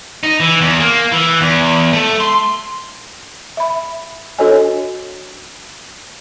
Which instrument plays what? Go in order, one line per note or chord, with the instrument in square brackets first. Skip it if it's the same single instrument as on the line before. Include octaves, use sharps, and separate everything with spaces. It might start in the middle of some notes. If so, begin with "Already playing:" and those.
[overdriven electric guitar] D#4
E3
E2
A#3
E3
E2
A3
C6
[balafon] E5 B5
D4 F#4 A4 C#5 D#5 G#5